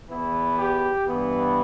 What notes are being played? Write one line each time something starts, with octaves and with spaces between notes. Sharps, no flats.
E2 E3 B3 E4
G4
G2 E3 B3